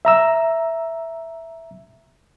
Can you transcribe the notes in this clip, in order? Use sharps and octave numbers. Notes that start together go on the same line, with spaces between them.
E5 A#5 E6